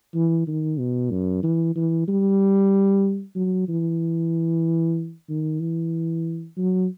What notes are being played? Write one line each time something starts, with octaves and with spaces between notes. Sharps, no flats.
E3
D#3
B2
F#2
E3
E3
G3
F#3
E3
D#3
E3
F#3